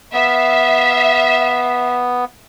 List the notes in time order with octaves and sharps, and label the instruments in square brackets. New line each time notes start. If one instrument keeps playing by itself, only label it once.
[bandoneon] B3 [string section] E5 F5